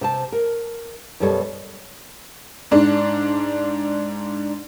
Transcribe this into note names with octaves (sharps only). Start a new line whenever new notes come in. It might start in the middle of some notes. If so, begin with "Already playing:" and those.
C3 C5 A5
A#4
F#2 B2 G3 A4 C#5
G#2 D4